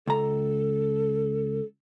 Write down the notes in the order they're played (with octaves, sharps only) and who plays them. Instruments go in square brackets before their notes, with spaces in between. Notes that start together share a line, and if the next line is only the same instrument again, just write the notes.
[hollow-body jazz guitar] C#2 A#5 [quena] A4